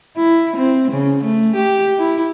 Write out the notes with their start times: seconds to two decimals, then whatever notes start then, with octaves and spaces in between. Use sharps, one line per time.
0.17 E4
0.57 C4
0.92 C#3
1.24 A3
1.56 G4
1.98 E4